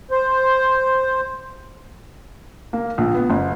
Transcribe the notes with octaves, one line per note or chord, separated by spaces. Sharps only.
C5
A#3
A#1
B3
F#1